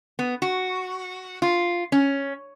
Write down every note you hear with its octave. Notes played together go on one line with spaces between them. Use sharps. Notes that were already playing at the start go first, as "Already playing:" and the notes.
B3
F#4
F4
C#4